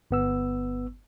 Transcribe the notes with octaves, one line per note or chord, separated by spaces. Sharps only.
G1 B3 E6